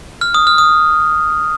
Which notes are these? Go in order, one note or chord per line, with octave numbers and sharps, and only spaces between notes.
F6
D#6
F6
D#6